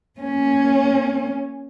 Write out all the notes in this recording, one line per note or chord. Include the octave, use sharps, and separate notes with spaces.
A#3 C#4